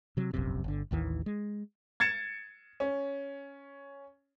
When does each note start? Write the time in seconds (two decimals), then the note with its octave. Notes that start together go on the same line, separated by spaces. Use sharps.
0.17 C3 F#3
0.34 E1 A#1 F#2 C3
0.64 G1 D3
0.91 A1 D#2 D#3 E3
1.26 G#3
2.00 G#6 A6 C#7 E7
2.80 C#4